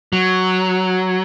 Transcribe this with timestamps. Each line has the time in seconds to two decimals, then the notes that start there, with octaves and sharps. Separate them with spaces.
0.13 F#3